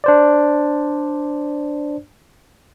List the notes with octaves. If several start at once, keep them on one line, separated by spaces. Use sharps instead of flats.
D4 C5 D5